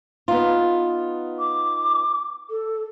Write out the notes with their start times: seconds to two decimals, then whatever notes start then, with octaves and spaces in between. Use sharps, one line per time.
0.28 B3 D#4 F4
1.39 D6
2.50 A4